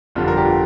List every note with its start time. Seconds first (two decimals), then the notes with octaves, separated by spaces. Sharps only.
0.15 G1 F2 D3 G3 F4
0.28 A#4
0.37 G4
0.45 F4